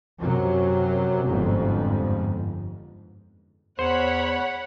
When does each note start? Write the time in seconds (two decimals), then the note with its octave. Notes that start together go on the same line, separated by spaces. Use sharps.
0.19 F#2 C3 F#3
1.25 G1 F2 G#2
3.79 E2 C5 C#5 F#5 B5